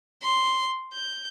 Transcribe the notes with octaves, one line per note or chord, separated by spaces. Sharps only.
C6
G6